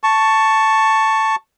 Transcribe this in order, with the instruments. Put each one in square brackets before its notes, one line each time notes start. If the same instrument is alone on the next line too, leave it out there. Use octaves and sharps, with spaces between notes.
[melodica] A5 C#6